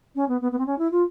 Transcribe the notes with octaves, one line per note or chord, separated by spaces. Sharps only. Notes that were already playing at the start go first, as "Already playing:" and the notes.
C#4
B3
B3
B3
C4
C#4
E4
F4